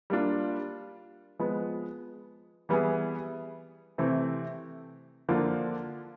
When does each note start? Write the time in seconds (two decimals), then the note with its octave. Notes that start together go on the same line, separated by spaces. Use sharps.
0.10 G3 A#3 D4 F4
1.39 F3 G#3 B3
2.69 E3 G3 B3 E4 G#4
3.98 C3 E3 A3 C4
5.29 D3 F3 A#3 D4 F4